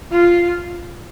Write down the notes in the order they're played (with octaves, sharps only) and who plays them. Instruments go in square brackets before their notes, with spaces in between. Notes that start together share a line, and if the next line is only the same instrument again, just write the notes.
[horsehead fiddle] F4